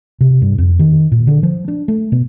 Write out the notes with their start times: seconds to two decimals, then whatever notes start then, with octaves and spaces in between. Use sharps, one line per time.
0.21 C3
0.42 G2
0.58 F2
0.79 D#3
1.12 A#2
1.27 D3
1.43 F3
1.68 D4
1.88 A3
2.12 B2